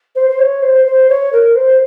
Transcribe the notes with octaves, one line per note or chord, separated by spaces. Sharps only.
C5
C5
C#5
C5
C5
C#5
A#4
C5